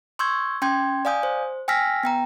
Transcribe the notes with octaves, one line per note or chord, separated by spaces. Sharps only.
C6 C#6 E6 G6 G#6
C#4 G5 C6 G6 G#6
D5 F5 G#5 D#6 G6
C5
G5 G#5 E6 F6 A#6 B6
B3 G5 A#5